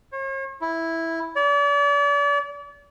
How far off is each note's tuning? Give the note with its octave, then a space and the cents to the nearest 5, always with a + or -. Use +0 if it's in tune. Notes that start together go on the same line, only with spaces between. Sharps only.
C#5 -45
E4 -5
D5 -40